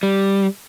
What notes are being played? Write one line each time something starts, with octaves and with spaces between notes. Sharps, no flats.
G3